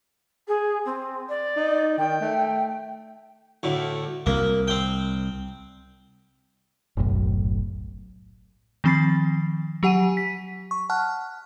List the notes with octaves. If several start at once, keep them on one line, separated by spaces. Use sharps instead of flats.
G#4
C4
D5
D#4
D#3 G5
A3
D2 A2
C2 A#3
C4 G5
F#1 B1 F#2 A2
D#3 F3 C4 B5 A6 C7
F#3 G4 F#5 G#5 D#7
B6
C#6
F#5 A5 F6 F#6